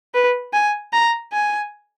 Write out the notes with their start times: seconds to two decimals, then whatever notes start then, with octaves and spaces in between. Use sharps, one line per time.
0.14 B4
0.53 G#5
0.93 A#5
1.32 G#5